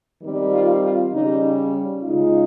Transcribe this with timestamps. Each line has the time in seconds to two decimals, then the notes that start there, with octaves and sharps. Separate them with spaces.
0.21 D#3 G3 C4
0.51 F4
0.81 F4
1.11 C#3 G3 C#4 D#4
2.01 C#3 G#3 D#4 F4